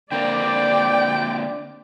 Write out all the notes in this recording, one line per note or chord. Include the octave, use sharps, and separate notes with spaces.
D3 A#3 C4 D5 G5